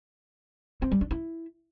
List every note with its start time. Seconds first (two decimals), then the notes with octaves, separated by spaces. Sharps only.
0.82 C4
0.92 G3
1.01 D4
1.11 E4